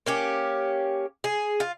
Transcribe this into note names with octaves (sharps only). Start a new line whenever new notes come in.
A#3 C#4 G4
G#4
F4